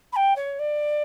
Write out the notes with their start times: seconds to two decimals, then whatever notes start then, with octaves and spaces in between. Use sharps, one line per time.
0.12 B5
0.16 G5
0.35 C#5
0.59 D5